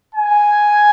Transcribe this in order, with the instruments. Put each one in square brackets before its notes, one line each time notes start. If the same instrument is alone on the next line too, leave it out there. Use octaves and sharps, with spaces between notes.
[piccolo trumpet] G#5